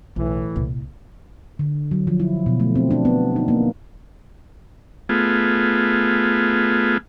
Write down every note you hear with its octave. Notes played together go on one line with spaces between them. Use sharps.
B1 A2 E3
C2 A#2
D3
F#3
F3
E4
B2
A3
C4
D4
B3
D#4
A#3
A3 B3 F4 G#4